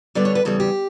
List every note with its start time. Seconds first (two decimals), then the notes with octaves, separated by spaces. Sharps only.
0.15 D3 G3 B3 D4 D5
0.25 C#5
0.35 B4
0.45 E2 C#3 G3 A4
0.60 G4